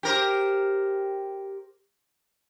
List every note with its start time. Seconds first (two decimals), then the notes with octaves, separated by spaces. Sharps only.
0.03 G4 A#4 C5